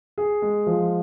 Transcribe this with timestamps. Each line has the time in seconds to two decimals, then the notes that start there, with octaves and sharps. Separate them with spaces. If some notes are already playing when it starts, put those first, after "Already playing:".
0.18 G#4
0.42 G#3
0.67 F3